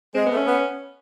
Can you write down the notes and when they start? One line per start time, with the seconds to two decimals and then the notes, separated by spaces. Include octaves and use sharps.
0.15 G#3 C4
0.26 B3
0.31 A3
0.37 C#4
0.47 B3